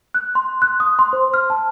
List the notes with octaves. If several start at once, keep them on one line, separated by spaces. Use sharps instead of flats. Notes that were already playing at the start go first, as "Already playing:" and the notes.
F#6
C6
F#6
D#6
C6
C5
F6
A5